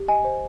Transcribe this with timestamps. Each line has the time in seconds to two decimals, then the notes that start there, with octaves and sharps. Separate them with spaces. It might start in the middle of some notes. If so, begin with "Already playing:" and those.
Already playing: G4
0.08 D#5 G#5
0.24 C5